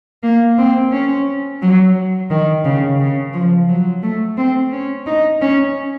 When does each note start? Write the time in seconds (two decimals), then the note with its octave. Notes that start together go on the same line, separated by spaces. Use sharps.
0.23 A#3
0.58 C4
0.92 C#4
1.62 F#3
2.30 D#3
2.65 C#3
2.99 C#3
3.33 F3
3.69 F#3
4.03 A3
4.37 C4
4.72 C#4
5.07 D#4
5.41 C#4